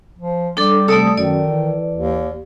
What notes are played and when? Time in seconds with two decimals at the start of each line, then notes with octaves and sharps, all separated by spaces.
0.19 F3
0.57 G3 D4 A4 D6
0.88 C3 A3 A4 D5 D#6
1.17 F#2 D#3 D5
1.50 E3
1.95 D#2